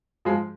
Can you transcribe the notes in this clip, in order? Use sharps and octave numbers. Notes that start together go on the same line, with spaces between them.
F3 G#3